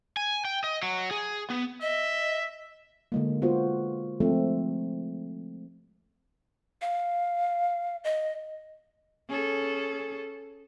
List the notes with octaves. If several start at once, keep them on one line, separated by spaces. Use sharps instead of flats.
G#5
G5
D#5
F#3
G#4
B3
D#5 E5
D3 G#3 A#3
B3 F4 F#4 C5
F3 G#3 A3 C4 A4
F5
D#5
C#4 G#4 A4